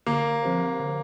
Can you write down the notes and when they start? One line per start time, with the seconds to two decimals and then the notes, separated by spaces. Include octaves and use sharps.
0.07 D3 A#3
0.43 F3 C4 G4 C5
0.79 D3